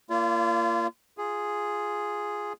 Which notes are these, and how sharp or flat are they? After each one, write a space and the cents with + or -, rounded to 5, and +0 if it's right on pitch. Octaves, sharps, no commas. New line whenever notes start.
A#3 -10 F4 -35 D5 -35
F4 +0 G#4 +0